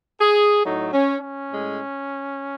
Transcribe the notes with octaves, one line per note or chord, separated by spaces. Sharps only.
G#4
A2 F#3 A3 D#4
C#4
C#4
A2 G#3